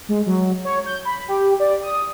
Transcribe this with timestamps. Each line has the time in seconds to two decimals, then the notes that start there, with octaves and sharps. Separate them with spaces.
0.09 G#3
0.26 F#3
0.65 C#5
0.86 G6
1.05 B5
1.28 G4
1.60 D5
1.83 D#6